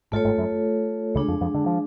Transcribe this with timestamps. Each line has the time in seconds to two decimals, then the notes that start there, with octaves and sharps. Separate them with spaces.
0.12 G#1 G#2 A3 F4 A4 C#5
0.25 G#1 G#2
0.38 F#2
1.15 C#2 C#3 G#3 D4 G#4
1.28 F2 F3
1.41 F2 F3
1.54 D3
1.66 F3